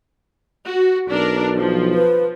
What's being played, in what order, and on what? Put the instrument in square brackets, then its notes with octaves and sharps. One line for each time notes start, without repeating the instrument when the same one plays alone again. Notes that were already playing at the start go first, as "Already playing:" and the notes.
[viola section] F#4
[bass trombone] B1 [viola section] D4 A#4
[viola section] F3
[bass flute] B4